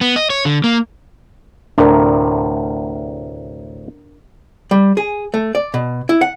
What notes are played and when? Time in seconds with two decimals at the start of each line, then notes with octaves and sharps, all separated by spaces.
0.01 B3
0.16 D#5
0.30 C#5
0.45 D3
0.64 A#3
1.78 D2 A2 C3 D4 A#4
4.71 G3
4.97 G#4
5.34 A3
5.55 D5
5.74 B2
6.09 E4
6.21 F#5